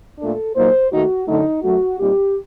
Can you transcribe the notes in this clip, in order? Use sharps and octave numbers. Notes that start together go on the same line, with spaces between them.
A#2 A3 D4 A4
A#2 F#3 A#3 D#4 C5
D#2 D#3 A3 D#4 F#4
F#2 D3 F#3 A3 D#4
F#2 F#3 A3 F#4
A#2 G3 C4 D#4 G4